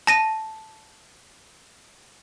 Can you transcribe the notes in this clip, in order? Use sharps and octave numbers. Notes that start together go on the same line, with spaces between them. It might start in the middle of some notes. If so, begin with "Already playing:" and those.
A5 A#6 D#7